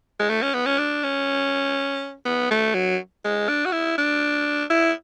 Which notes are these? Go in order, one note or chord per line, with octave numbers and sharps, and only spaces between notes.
G#3
A3
C#4
B3
C#4
D4
C#4
B3
A3
F#3
G#3
D4
F#4
E4
D4
E4